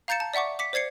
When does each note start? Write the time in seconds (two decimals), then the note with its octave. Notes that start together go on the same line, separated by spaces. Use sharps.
0.08 F5 A#5 G6 A6 C#7 E7
0.20 A5
0.34 D5 E5 F#5 C#6 D6
0.59 D6 B6 C#7
0.73 C5 D5 G#6 C7 C#7